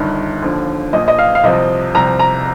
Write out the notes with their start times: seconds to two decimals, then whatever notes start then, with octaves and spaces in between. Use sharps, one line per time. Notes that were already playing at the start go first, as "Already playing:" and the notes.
Already playing: G1 G2 D#3
0.42 D#2 D3 F3
0.93 A#1 A#2 F3 D#5
1.08 D#5
1.19 F5
1.35 F5
1.43 C2 C3 F3 D#5
1.94 C2 C3 F3 A#5
2.19 A#5